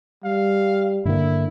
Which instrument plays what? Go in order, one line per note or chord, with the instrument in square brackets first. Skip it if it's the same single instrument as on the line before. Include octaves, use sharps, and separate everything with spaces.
[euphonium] G3 [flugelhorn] F5
[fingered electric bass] G2 D3 A#3 [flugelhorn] E4